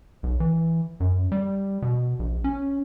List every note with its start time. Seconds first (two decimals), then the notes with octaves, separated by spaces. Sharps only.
0.23 B1
0.40 E3
1.00 F#2
1.32 G3
1.82 B2
2.19 A#1
2.44 C#4